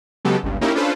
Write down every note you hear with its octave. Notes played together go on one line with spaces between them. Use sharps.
C#3 F#3 G#3 B3 G4 A4
G1 C#2 G2
A#3 C#4 D#4 E4 G4 A#4
C#4 D4 F4 A4 B4 C5